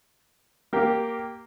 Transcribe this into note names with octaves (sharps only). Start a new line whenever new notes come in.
A#3 G4